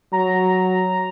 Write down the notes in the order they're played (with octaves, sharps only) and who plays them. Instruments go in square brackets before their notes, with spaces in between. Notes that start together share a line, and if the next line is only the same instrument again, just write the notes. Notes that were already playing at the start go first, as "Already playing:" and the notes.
[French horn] F#3 [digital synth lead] A#5